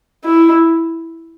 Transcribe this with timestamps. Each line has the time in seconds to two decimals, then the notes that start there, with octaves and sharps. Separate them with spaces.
0.24 E4